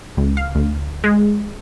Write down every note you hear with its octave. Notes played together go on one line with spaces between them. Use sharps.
C#2
F5
D2
G#3